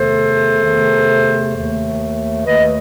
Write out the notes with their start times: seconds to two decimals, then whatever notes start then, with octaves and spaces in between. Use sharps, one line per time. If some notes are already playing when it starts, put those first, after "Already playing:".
Already playing: E2 C3 D#3 A3 A4 C5
0.63 E2 C3 D#3 A3
1.54 D#2 D#3 A3
2.46 D#2 D#3 A3 B4 D#5